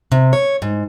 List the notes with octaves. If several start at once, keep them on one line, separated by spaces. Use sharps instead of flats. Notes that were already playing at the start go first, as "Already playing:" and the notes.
C3
C#5
G#2